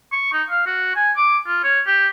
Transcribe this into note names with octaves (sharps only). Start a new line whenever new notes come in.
C#6
D#4
F5
F#4
G#5
D6
F4
C#5
G4